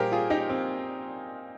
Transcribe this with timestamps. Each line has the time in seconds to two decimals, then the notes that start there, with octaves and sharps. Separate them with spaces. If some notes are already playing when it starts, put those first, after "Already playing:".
Already playing: A#2 G3 A#3 G4 G#4 A#4 C5
0.12 F4 G#4
0.30 D#4 G4
0.49 C4